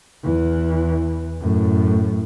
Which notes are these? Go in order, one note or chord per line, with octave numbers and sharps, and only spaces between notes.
E2 E3
F#2 A2